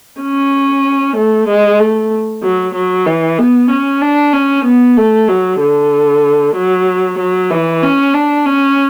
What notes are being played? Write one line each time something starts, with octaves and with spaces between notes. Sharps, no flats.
C#4
A3
G#3
A3
F#3
F#3
E3
B3
C#4
D4
C#4
B3
A3
F#3
D3
F#3
F#3
E3
C#4
D4
C#4